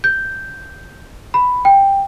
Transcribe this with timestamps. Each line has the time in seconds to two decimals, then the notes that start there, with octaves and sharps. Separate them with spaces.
0.04 G6
1.34 B5
1.65 G5